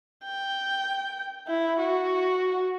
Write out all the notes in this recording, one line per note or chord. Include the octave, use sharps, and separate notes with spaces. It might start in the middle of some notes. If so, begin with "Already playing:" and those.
G5
E4
F#4